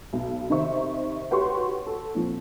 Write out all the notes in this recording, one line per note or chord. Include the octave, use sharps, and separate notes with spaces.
B1
C3 D#3 D#4 C5 E5 C#6
F#4 G4 B4 C#5 C6 C#6
A4
A#2 F3 C4